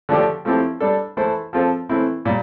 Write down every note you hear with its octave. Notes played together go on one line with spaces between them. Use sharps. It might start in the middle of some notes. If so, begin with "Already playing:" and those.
D3 F3 A3 D4 G4
F3 A3 C4 E4 G4
G3 D4 A4
E3 A3 E4 A4 C5
F3 C4 F4 A4 C5
E3 A3 C4 E4
A#2 G3